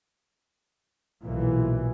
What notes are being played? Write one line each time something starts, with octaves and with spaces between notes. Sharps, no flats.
B1 A#2 E3